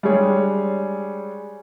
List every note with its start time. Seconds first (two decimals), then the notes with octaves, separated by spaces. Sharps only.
0.03 G3 G#3 D4 G#4 C#5